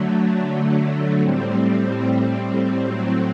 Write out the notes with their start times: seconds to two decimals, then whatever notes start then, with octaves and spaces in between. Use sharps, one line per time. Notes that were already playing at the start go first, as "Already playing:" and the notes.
Already playing: D3 F#3 A3
1.20 A2 G3 C4
2.82 A2 F#3 C4